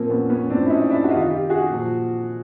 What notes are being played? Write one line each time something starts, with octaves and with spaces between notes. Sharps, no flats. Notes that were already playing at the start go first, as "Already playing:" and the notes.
Already playing: A#2 F3 A#3 C4
B3 C#4
B3 C#4
A2 F3 C4 D4
E4
C#4 D#4
D4 E4
F#4
C3 D#3 D#4 F4
F4 G4
F#4 G#4
A#2 F3